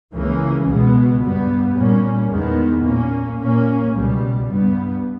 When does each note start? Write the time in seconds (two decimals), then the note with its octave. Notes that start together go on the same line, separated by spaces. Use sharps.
0.13 C#2 C#3 E3 A#3 C#4
0.67 C#2 B2 G#3 B3
1.22 G2 G3 B3
1.76 A#2 G3 A#3 C#4
2.30 E2 D#3 G#3 B3
2.85 A#2 A#3 C#4
3.39 A#2 A#3 C#4
3.93 C#2 B2 G3
4.48 G2 G3 B3